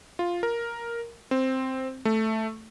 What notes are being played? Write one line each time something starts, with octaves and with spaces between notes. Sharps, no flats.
F4
A#4
C4
A3